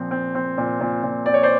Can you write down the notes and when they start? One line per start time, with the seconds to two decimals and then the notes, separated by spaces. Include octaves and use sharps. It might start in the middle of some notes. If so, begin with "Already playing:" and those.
Already playing: A#2 F3 C4
0.11 C4
0.35 C4
0.58 A#2
0.81 A#2
1.03 A#2
1.26 C4 D5
1.34 C#5
1.43 C5 D5